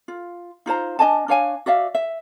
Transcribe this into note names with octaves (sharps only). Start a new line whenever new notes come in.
F4
D#4 F4 C5 A#5
D4 D#5 G#5 A5
D4 C#5 F5 G#5
F#4 D5 E5 F5
E5